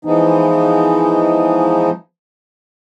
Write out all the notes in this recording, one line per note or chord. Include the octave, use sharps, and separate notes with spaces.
E3 F3 G#3 B3 D#4